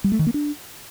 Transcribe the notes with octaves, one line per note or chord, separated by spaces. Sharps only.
G3
A3
D#3
A#3
D4